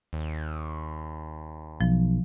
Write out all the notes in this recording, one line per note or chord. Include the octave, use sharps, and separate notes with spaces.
D#2
B1 F3